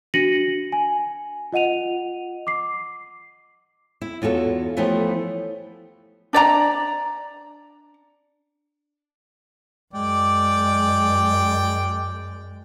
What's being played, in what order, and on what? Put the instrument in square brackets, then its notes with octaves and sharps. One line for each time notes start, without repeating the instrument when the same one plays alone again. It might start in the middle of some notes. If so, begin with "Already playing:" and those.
[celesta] D4 F#4 A#6 C#7 D#7 F#7
G#5
F4 D#5 F#5 D#7 F7
D6 C7
[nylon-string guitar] E4
E2 F4 F#4 A4 C#5
E3 F3 A3 B3 G4 C#5
[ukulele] D4 D5 D#5 A#5
[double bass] F#2 G#3 [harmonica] D5 G5